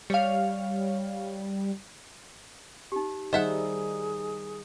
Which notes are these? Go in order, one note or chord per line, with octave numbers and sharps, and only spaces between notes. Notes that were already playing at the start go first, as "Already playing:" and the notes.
G3 C#5 F5
D#4 G4
D#3 G3 D#4 G#4 C5 D#5 E5 F#5